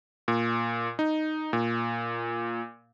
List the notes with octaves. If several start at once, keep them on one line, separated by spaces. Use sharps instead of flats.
A#2
D#4
A#2